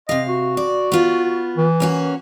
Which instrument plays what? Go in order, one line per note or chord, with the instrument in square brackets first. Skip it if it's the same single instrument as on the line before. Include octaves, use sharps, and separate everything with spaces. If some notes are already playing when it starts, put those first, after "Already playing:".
[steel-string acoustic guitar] C3 F5 [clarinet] D#5
[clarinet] F#4
[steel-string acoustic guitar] D5
B3 F4
[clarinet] E3
[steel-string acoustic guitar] A#3 C#4 F#4